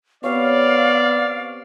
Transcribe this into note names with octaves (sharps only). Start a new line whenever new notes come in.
B3 C4 G4 C#5 D5 F5